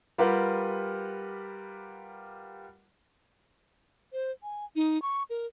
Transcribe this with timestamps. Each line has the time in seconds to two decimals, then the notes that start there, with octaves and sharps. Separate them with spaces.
0.18 G3 F4 G4 A#4 B4 F#5
4.13 C5
4.43 G#5
4.76 D#4
5.02 C#6
5.30 A#4